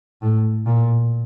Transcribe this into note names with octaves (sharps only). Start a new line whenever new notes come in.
A2
A#2